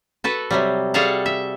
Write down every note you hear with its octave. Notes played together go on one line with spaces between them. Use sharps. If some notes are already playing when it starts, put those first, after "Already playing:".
F#4 A4 B4
C3 F#3 G3
G3 F#4 G#4 A4 F5 F#5
E5